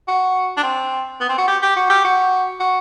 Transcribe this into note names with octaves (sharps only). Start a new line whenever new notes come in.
F#4
D4
C4
B3
C4
F#4
G4
G4
F#4
G4
F#4
F#4